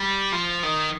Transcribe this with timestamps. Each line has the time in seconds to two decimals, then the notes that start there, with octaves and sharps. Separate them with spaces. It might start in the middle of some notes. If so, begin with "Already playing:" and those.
Already playing: G3
0.32 F3
0.63 D#3